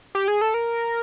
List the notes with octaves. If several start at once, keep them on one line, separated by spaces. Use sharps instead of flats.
G4
G#4
A4
A#4